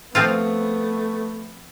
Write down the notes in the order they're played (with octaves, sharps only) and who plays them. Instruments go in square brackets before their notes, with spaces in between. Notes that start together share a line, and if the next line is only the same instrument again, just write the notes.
[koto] F3 C4 F4 [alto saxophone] A3 [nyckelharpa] B3